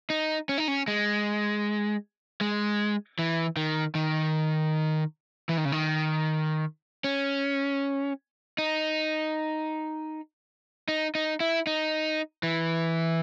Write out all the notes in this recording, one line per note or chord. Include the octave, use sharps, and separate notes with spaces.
D#4
C#4
D#4
C#4
G#3
G#3
E3
D#3
D#3
E3
D#3
C#3
D#3
C#4
D#4
D#4
D#4
E4
D#4
E3